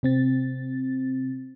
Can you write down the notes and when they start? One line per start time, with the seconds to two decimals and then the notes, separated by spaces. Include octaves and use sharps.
0.03 C3 C4 A6